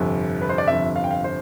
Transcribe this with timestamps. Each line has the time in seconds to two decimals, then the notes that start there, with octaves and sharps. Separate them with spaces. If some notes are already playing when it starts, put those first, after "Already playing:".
Already playing: G1 F2 C3
0.42 B4
0.49 C5
0.58 D5
0.67 G1 F2 C3 E5
0.96 F5
1.04 G5
1.11 F5
1.24 C5